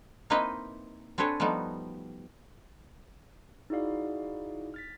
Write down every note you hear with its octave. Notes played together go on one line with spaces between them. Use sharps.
A#3 C4 D#4 E4 B4 D#5
C4 D4 A4 B4 C#5 G#5
F3 G3 A3 B3 D#4 F#4
D#4 E4 F#4 G#4 D5 F5
F6 A6 B6